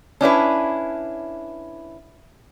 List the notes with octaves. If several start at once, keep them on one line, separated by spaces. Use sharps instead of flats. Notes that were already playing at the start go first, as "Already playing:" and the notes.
C#4 D4 E4 B4